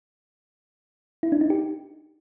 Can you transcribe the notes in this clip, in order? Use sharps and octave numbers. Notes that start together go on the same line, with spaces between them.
E4
D4
D#4
G4